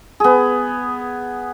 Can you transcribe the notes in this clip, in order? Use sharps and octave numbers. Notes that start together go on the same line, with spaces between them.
B3 G#4